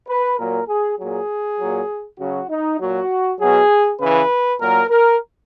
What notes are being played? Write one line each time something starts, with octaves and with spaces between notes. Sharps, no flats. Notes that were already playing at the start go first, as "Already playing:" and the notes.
B4
A#2 F#3 A#4
G#4
A#2 F#3 G#4
A#2 F#3
C#3 F#3 F#4
D#4
A#2 F#3 F#4
B2 F#3 G#4
C#3 E3 B4
A#2 F#3 A#4
A#4